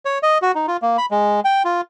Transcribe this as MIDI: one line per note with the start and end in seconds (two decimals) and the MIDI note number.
0.05 0.18 73
0.23 0.38 75
0.42 0.52 66
0.55 0.66 63
0.67 0.77 65
0.82 0.97 58
0.98 1.06 83
1.11 1.40 56
1.45 1.63 79
1.65 1.81 65